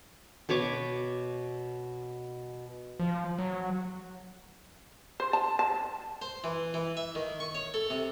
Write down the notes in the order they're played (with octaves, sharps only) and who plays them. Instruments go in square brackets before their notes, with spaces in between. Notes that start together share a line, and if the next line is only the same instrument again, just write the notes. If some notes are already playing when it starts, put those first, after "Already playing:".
[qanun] B2 B4 C#5 D6
[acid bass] F3
F#3
[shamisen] C5
A5
A5
[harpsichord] C5
E3
E3
E5
D#3
C#6
C#5
A4
C3